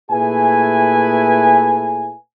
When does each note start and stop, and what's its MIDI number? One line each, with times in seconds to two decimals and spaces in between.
0.11 2.12 46
0.11 2.12 57
0.11 2.12 64
0.11 2.12 68
0.11 2.12 71
0.11 2.12 80